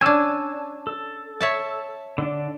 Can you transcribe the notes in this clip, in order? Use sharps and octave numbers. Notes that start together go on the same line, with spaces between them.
C#4 D4 G#5 E6
A4
C#5 E5 A5
D3 D4